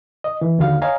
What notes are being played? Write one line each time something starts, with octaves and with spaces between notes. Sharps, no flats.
D#5
E3
D#2 D3 F#4 F5
C#5 D#5 F5 G#5 A#5